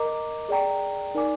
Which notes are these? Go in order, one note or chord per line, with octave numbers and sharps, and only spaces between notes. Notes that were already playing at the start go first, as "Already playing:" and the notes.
Already playing: A#4 D#5 A#5 D6
G#4 D5 G5 A#5
D#4 A#4 D5 G#5 D6